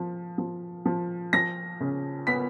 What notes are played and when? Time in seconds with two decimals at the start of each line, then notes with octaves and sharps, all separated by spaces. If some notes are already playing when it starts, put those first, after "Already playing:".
Already playing: F3
0.38 F3
0.86 F3
1.33 F3 A#6
1.80 C#3
2.27 B3 B6